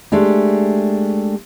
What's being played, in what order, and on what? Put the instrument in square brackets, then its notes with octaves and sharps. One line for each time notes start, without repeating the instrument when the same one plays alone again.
[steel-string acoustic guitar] G#3 A3 D4 G4